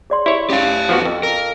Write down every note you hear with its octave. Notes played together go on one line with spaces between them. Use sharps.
G#4 D5 C6
E4 G4 C#5
C#4 G4 F5
F3 B3 F#4
F2 F5
A#4